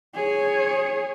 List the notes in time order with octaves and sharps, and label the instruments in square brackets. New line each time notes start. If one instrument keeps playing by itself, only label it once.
[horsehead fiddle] G#4 C#5